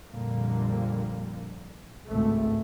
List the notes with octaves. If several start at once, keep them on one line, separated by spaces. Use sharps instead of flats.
A#1 F2 A#2 D3 G3 A#3
G#1 C#2 A2 A3